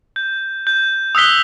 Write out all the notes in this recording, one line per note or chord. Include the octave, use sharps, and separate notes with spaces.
G6
G6
D#6 E6 F#6 B6 G7